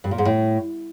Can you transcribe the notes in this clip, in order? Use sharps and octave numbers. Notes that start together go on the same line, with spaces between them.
G2
A#2
G#2
A2